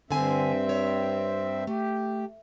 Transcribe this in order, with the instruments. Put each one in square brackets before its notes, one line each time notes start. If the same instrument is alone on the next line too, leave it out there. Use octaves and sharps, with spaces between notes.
[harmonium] G2 C4 E5 [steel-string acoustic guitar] D3 G#5
[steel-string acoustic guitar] C#5
[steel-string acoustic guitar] A3 [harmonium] G4